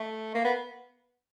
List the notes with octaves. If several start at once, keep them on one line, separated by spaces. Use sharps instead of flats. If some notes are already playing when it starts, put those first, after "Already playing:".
Already playing: A3
A#3
B3